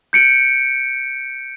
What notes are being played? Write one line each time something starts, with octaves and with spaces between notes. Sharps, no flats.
G6 C#7 D7